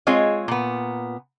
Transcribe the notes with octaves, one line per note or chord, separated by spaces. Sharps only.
G#3 C4 F4 G#4 C#5 D#5
A#2 B3